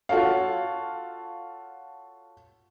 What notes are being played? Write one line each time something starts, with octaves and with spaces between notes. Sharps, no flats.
F4 F#4 A4 C#5 F5